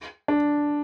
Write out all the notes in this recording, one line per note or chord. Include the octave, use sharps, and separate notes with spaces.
D4